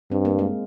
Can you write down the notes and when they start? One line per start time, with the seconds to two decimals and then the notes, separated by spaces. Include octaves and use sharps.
0.11 G2 C4
0.25 A#3
0.39 G#3